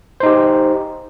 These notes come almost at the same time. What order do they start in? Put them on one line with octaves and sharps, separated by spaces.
C5 D#4 G4